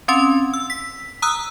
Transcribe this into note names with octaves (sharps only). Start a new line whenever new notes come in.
C4 C#4 C6
E6
B6
A#5 D#6 E6 F#6